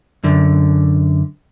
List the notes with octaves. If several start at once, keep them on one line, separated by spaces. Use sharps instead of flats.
F#2 D3